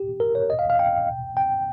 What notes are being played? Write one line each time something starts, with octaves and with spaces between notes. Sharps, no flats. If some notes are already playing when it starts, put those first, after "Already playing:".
Already playing: G4
A#4
C#5
D#5
F5
F5
G5
G5